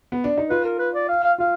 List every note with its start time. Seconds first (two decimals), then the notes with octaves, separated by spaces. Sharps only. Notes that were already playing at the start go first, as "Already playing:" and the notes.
0.12 B3
0.24 D4
0.37 D#4
0.50 F4 B4
0.65 A#4
0.79 B4
0.94 D5
1.09 F5
1.24 F5
1.38 F4 F5